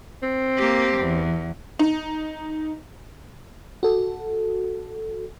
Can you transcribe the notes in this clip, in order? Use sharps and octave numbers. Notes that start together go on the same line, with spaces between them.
C4
A#3 G4
E2
D#4
F#4 A4